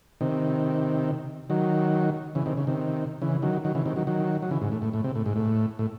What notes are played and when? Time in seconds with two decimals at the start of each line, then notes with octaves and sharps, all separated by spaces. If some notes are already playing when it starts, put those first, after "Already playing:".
0.21 C3 D#3
1.50 D#3 F#3
2.35 C#3 E3
2.46 C3 D#3
2.57 C#3
2.67 C3 D#3
3.22 C#3 E3
3.42 D#3 F#3
3.65 D#3 F#3
3.75 C#3 E3
3.86 C3 D#3
3.96 D#3 F#3
4.07 D#3 F#3
4.42 F#3
4.51 C#3 E3
4.62 G#2
4.72 A2
4.82 A2
4.94 A2
5.04 C3
5.15 A2
5.26 G#2
5.36 A2
5.79 A2